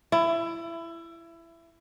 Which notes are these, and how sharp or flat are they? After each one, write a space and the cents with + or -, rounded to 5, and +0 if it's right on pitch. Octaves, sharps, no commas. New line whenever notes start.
E4 +20